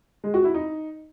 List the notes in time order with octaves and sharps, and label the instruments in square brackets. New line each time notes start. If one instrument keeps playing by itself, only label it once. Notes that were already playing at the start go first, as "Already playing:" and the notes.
[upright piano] G#3
F#4
E4
D#4